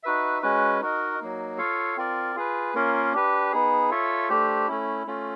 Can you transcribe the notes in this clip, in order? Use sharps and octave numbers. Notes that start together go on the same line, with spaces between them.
D#4 F#4 B4 E5
G#3 C#4 F#4 B4
D#4 F#4 A#4 D#5
F#3 A#3 D#4
F4 A4 C#5 F5
C4 F4 A#4 D5
F4 G#4 B4
A#3 C#4 F4 A#4
D4 G4 B4
B3 D#4 G#4
F4 A4 C#5 E5
A3 D4 G4 C5
A3 C#4 E4
A3 C#4 F4